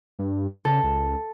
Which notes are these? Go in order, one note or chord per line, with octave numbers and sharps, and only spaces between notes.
G2
C#3 A4
C#2